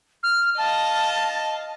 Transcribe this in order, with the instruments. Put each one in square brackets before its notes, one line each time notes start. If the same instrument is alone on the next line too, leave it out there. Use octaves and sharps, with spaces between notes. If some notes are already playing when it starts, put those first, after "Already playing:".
[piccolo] F6
[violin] D#5 F5 [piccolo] A5